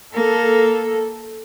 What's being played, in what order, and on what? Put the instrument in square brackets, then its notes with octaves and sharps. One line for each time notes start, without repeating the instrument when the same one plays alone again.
[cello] A#3 [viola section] A4